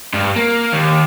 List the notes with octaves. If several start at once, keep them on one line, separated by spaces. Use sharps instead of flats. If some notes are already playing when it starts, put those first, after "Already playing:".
G2
A#3
D#2